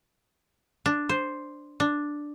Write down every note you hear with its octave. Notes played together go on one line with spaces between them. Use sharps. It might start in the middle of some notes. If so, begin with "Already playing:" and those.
D4
C5
D4